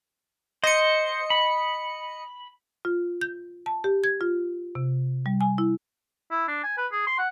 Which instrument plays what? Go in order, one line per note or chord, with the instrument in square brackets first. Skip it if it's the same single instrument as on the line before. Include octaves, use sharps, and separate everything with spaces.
[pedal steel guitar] C5 [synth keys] D#5 C#7
[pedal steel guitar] B5
[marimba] F4
G6
A5
G4
G#6
F4
C3
G3
G#5
E4
[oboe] E4
D4
G#5
B4
G#4
C6
F#5